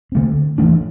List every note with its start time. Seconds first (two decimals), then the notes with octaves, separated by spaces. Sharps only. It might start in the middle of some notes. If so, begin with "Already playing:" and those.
0.12 D3 A3 C4
0.58 E3 A3 D4